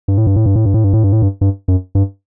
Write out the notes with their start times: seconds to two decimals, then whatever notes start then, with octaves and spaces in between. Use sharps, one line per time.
0.08 G2
0.17 A2
0.27 G2
0.36 A2
0.46 G2
0.56 A2
0.65 G2
0.74 A2
0.84 G2
0.93 A2
1.03 G2
1.12 A2
1.22 G2
1.41 G2
1.68 F#2
1.95 G2